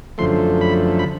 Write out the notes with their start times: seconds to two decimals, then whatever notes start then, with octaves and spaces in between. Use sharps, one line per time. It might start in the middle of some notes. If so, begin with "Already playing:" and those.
0.18 F#2 D3 F3 A3 C6
0.61 B5
0.99 B5